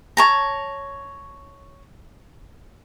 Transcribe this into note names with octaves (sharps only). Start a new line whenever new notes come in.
C#5 A5 A#5